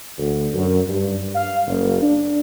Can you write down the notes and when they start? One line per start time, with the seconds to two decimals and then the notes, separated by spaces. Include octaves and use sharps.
0.18 D2
0.54 F#2
0.88 G2
1.35 F5
1.67 F#1
2.02 D4